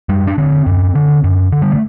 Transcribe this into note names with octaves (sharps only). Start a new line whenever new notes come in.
F#2 G3
D4
D3 C4
F#2
D3
F#2
D3
G3
A3